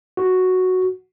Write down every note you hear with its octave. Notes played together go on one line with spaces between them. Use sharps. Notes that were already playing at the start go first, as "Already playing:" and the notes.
F#4